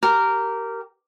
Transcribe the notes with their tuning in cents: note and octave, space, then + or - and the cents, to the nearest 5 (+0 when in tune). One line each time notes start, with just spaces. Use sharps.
G4 -20 A#4 -10